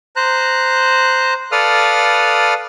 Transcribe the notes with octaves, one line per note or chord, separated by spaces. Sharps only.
C5 A#5 F#6
A4 B4 D5 F5 D#6 F6